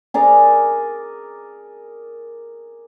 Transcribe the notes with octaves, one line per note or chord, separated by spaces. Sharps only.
G#4 A#4 D5